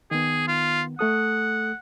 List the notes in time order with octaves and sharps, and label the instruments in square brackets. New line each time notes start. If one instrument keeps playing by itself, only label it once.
[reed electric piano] D#3 B3 [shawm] G#4
[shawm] F4
[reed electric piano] A3 A4 D#6 [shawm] F#5